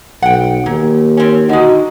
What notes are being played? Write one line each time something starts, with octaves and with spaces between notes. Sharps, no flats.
B1 F#5 G5
D#2 A#2
C4 C#4
D3 G#3 D#4 F#4